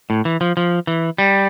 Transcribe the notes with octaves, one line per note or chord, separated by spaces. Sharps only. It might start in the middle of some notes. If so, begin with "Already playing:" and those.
A2
E3
F3
F3
E3
G3